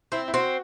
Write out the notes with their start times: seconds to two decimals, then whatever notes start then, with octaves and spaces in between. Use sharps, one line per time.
0.12 C4 E4
0.28 E4
0.34 C4 F#4